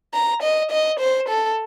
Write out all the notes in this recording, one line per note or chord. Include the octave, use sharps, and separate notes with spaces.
A#5
D#5
D#5
C5
A4